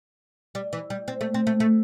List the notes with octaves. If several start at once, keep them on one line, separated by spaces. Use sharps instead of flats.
G3
E3
G3
C4
A3
C4
A3
A3